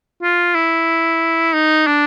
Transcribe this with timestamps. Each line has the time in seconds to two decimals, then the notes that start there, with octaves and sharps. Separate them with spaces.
0.23 F4
0.55 E4
1.54 D#4
1.87 D4